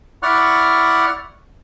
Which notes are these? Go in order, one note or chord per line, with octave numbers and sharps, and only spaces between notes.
E4 D5 F#5 C#6 F6 F#6